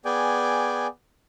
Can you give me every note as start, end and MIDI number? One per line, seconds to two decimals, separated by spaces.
0.05 0.87 59
0.05 0.87 68
0.05 0.87 74
0.05 0.87 79
0.05 0.87 80